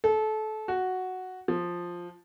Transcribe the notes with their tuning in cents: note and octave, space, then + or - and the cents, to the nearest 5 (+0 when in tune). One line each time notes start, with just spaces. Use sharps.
A4 -25
F#4 +0
F3 +5